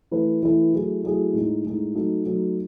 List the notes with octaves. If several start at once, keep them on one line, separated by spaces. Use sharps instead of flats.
E3 A3 E4 B4
E3 A3 E4 B4
F#3 A3 E4 G#4
F#3 A3 E4 G#4
A2 G#3 D#4
A2 G#3 D#4
F#3 A3 D#4
F#3 A3 D#4